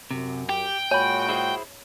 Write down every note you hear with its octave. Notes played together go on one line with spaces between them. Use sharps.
F#2 C3
G4 G5
A#2 G#3 F#4 C#5 G#5 B5
E4 G#4 C5